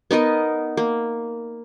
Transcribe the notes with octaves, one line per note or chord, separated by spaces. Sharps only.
B3 D#4 A#4 D#5
A#3